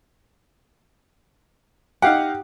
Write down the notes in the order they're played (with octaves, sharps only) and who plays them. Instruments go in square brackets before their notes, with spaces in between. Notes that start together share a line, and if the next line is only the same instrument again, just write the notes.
[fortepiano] D#4 F5 F#5 [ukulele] G4